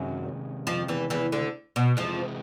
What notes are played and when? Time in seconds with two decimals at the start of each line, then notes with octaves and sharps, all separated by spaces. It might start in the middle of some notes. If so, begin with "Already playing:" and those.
Already playing: F#2 C3 D#3 F#3 G#3 C#4
0.67 F2 F3
0.88 E2 E3
1.10 E2 E3
1.32 D2 D3
1.76 B2
1.97 F2 C3 E3 F3 G#3